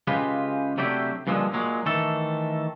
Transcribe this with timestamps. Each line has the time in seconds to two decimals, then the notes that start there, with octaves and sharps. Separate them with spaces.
0.07 C#3 G#3 F4 G4 B4
0.77 C3 F#3 A3 D4 E4 G4
1.27 G2 A#2 D3 F3 G#3
1.53 A#2 F#3 G#3
1.86 D#3 E3 A3 A4